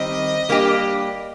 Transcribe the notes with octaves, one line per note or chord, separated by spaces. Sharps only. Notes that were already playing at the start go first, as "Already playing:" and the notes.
Already playing: D#3 G3 C4 G4 D#5
G3 A#3 D4 G4